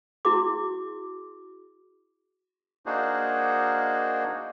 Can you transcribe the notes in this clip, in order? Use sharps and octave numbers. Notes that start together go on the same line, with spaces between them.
E4 F#4 G#4 D6
A#3 D4 D#4 F#4 G#4 C5